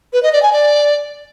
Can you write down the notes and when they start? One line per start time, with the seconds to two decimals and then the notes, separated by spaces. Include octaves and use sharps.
0.13 B4
0.23 D#5
0.33 D5
0.43 G#5
0.53 D5